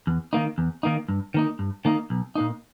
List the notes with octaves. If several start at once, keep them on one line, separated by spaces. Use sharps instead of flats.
E2
D#3 A#3 D#4
E2
D#3 A#3 D#4
G2
D#3 A#3 D#4
G2
D#3 A#3 D#4
B1
A#2 A#3 D#4